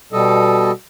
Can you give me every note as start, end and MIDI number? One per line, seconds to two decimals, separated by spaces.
0.13 0.72 47
0.13 0.72 55
0.13 0.72 69
0.13 0.72 75